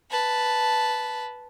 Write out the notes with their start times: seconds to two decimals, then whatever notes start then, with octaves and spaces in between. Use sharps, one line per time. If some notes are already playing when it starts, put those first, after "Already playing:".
0.11 B4 A5